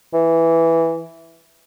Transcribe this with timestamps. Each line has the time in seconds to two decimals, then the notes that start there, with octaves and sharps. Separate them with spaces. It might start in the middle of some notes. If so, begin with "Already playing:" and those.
0.13 E3